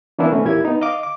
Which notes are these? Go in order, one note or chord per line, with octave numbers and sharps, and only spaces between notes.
E3 A#3 B3 C#4 D4 E4
B2 D#3 A3 C4 C#4
E2 A#2 A#3 E4 G4 G#6
B3 D#4
D#5 F5 D6
D6